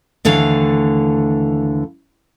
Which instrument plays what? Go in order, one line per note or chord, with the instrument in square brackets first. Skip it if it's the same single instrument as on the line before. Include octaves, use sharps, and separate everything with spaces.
[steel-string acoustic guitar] D#2 D3 E3 A3 F5